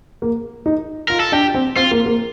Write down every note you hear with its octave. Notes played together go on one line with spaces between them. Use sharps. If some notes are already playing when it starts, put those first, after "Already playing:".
A#3
D#4
F4 A#4
A4
D4 G4
C4
C4 F4
A#3
A#3